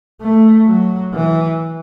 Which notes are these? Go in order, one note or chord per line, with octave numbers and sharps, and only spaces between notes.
A3
F#3
E3